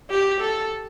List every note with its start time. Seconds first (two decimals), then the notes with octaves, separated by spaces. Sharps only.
0.10 G4
0.41 A4